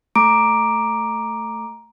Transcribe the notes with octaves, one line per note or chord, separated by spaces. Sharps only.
A3 A#5 D6 D7